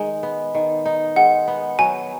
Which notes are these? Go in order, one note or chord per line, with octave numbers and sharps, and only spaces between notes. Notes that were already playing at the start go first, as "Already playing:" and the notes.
Already playing: D#3 G#3 D#4
B3
D#3
D#4
G#3 F#5
B3
F#3 G#5